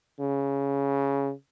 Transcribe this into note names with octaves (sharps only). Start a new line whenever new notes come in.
C#3